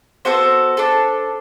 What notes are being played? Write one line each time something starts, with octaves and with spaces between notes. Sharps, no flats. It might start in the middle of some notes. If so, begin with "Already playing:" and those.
B3 F#4 A4 C5
D4 A4